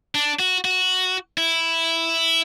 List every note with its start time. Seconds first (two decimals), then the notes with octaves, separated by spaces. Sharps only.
0.15 D4
0.39 F#4
0.65 F#4
1.38 E4